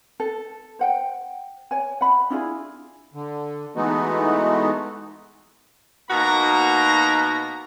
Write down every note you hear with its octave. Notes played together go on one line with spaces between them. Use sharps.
A4
C5 F#5 G5
C#5 G#5
F#5 B5
D4 E4 F4 G#4
D3
E3 G#3 A3 B3 D#4 F#4
B2 A#3 D#4 F#4 A#5